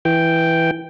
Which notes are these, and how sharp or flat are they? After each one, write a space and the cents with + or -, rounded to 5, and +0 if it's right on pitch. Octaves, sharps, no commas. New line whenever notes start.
E3 +0 G5 +0